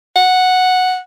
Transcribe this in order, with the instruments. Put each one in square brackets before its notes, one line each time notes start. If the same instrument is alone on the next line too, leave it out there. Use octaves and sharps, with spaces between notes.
[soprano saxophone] F#5